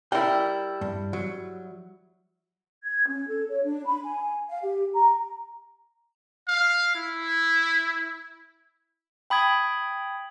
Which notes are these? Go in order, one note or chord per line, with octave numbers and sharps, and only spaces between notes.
G3 E4 A#4 G5
G2
F#3
G#6
C#4
A4
C#5
D4
B5
G#5
F5
G4
A#5
F5
E4
G5 B5 D#6 G#6